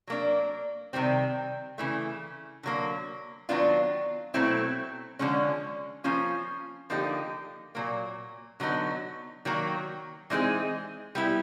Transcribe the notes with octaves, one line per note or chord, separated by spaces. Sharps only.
F#3 A#3 D4
C3 D#3 G3 C4
C#3 E3 A3
D3 F#3 A#3
D#3 F#3 B3 D4 F4
B2 F#3 A3 C4 E4
D3 F3 G#3 C#4
F3 A#3 C#4 F4
D3 F3 A#3 D#4 G4
A#2 F#3 A#3
D3 F#3 B3 D#4
D#3 F#3 A#3
E3 G#3 C4 D#4 G#4
G3 B3 E4 G4